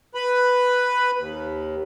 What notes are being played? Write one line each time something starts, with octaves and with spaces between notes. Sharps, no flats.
B4 B5
D#2